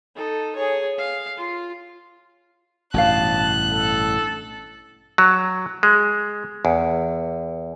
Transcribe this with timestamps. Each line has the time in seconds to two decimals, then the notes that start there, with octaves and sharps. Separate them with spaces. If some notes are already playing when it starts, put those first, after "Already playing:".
0.15 D#4 A4
0.56 G#4 C#5
0.98 F5
1.37 F4
2.94 A1 G2 B2 F#4 C#5 F5 A5 F#6
3.72 A4
5.18 F#3
5.83 G#3
6.65 E2